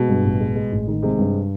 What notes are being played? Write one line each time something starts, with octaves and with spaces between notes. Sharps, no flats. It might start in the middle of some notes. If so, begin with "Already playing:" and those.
Already playing: B2 G#3
G2
A1
G#3
G#3
A1
D#3
C3 G#3
G2